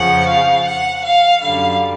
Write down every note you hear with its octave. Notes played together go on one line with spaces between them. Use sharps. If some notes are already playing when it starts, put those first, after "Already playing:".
Already playing: F2 C#3 F3 F#5
F5
F#5
F5
F#2 D3 G3 F5